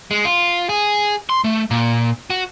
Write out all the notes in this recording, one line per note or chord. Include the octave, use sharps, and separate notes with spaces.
G#3
F4
G#4
C6
A3
A#2
F#4